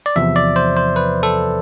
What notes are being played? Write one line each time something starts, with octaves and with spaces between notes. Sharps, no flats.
D5
E2 C3 F3 E5
D5
C5
C5
B4
A4